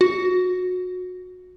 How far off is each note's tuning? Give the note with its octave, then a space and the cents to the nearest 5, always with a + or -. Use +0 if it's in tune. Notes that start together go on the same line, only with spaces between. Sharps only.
F#4 -25